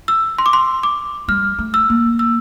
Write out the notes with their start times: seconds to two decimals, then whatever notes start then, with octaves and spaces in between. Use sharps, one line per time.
0.08 E6
0.38 C6
0.46 D6
0.53 C6
0.83 D6
1.28 G3 F6
1.59 A3
1.74 E6
1.90 A#3
2.19 E6